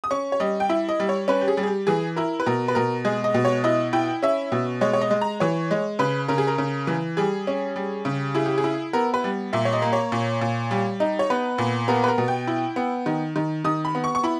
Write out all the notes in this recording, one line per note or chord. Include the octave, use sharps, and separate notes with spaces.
D#6
C#4 C#6
C#5
G3 D#5
G5
E4 E5
D#5
G3
C#5
C#4 B4
G4
G#4
G3
G#4
G4
E3 G#4
E4 A#4
B4
B2 A#4
B4
B2 A#4
G#3 G#4
D#5
B2
C#5
E4 D#5
E4 G5
C#4 E5
B2
G#3 C#5
C#5
D#5
G#3
A#5
E3 C#5
G#3
C#3 B4
C#3 A#4
G#4
A#4
C#3
E3
G3 G#4
C#4
G3
C#3
E4 G#4
G4
G#4
E4
B3 A#4
B4
G3
A#2 E5
C#5
D#5
A#3
C#5
A#2
A#2
G3
D#4
C#5
B3 B4
A#2
B3 A#4
B4
A#4
B2
G5
E4
B3
D#3
D#3
D#3 D#6
B5
B3
C#6
C#6
E4 B5